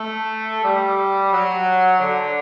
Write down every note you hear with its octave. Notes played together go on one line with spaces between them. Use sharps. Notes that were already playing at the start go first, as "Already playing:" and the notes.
Already playing: A3
G3
F#3
D3